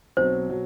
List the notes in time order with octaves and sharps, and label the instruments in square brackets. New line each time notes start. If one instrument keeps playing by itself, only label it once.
[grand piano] B1 B2 F#3 C4 F#4 [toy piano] C5
[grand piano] B2 F#3